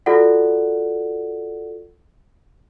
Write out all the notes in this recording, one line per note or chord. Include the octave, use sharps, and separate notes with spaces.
F4 F#4 A4 D5 F#5